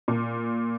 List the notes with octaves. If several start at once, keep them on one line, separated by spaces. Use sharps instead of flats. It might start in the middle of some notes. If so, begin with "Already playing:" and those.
A#2